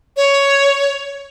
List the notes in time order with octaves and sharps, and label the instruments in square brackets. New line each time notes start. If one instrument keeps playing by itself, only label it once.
[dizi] C#5